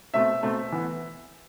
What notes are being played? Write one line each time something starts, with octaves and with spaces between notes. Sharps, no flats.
B2 A3 C4 E5
B2 A3 C4
E3 B3